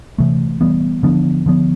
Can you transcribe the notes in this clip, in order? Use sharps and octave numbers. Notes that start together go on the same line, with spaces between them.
C3 E3 A3
E3 G3 B3
D3 F3 B3 D4
D3 F3 B3